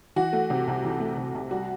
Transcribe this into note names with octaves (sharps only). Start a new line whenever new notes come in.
E3 F#4
A3
C3
C2
E3
A3
C3
C2
G3 F#4